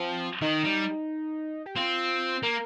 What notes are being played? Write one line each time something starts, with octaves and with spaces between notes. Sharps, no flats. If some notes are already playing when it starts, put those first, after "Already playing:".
Already playing: F3 C4
D#3 D#4
G3
G4
C4 F4
A#3 A#4